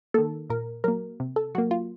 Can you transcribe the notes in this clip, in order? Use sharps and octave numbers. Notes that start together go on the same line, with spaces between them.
D#3 A#3 A4
A#2 A#4
F#3 A#3 A#4
C3
A4
F#3 A#3 F#4
F4